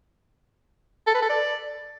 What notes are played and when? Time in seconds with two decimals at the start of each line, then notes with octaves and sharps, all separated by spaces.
1.07 A4
1.15 B4
1.22 A4
1.30 D5